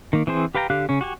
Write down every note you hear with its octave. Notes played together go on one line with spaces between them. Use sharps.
D#3 A#3
E3 C4 G#4 C5
G4 B4 F5 G5 A#5
D3 G4 F5 F#6
C#3 C#4
F#4 G4 G#5